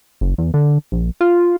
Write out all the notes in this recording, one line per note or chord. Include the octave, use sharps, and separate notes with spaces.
F#1
E2
D3
A#1
F4